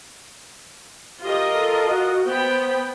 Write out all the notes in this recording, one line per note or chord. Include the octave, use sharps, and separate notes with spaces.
F4 G4 A#4 D#5
A4
F#4
B3 C5 G5 B5